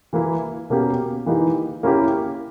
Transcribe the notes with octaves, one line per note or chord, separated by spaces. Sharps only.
E3 A#3 E4
B2 A#3 C#4 G4
E3 A#3 D#4 G4
A#3 C#4 E4 G4